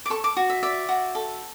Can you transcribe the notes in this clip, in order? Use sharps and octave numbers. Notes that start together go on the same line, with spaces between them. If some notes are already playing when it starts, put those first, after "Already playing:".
D6
A4 C#6
D6
F#4
E5
D5 E5
F#4
A4